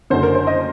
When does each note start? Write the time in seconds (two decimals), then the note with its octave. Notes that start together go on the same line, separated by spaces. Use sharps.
0.10 F#1 F#2 D3 C5
0.23 A#4
0.35 C5
0.47 D#5